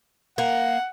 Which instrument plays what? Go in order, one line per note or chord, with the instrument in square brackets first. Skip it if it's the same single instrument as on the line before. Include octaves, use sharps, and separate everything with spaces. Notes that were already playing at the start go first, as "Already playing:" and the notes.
[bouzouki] A#3 [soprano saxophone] F#5